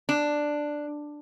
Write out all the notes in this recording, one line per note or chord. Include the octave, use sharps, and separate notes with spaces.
D4